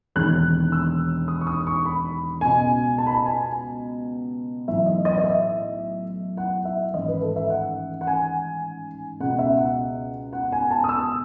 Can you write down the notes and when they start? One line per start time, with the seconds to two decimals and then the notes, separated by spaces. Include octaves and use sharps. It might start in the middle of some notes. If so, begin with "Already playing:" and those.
0.16 E1 D#2 D#3 F#6
0.72 E6
1.28 D#6
1.41 C#6
1.47 D#6
1.67 C#6
1.85 B5
2.41 C#2 B2 G#5
2.98 A5
3.07 B5
3.14 A5
3.26 G#5
4.68 B1 A2 E3 E5
4.86 D#5
5.05 D#5
5.18 D#5
5.24 E5
6.37 F#5
6.65 E5
6.94 A1 G#2 D#3 D#5
7.08 B4
7.22 A4
7.36 E5
7.50 F#5
8.01 F#5
8.07 G#5
9.20 C#2 B2 F#5
9.39 E5
9.57 F#5
10.33 F#5
10.52 G#5
10.71 A5
10.84 D#6
10.89 E6